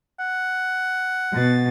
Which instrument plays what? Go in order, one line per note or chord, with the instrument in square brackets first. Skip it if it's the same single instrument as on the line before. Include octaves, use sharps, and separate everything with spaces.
[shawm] F#5
[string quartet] B2 A6